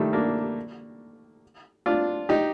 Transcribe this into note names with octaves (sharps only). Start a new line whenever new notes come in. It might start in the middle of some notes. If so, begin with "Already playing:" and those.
Already playing: D#3 G3 A3
A#3 D4
D4 F4
D#4 G4